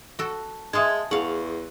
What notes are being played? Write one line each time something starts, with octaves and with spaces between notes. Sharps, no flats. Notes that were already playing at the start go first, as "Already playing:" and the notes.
F#4 A4
G#3 G#4 E5 F5 A5 C6 G#6
E2 G#4 F5 F#5 C#6